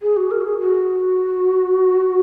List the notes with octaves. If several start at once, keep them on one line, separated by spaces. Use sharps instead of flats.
G#4
F#4
A#4
F#4
G#4
F#4